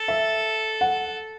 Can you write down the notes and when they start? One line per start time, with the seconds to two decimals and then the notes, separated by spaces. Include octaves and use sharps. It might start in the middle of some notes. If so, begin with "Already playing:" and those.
Already playing: A4
0.08 E5
0.81 F#5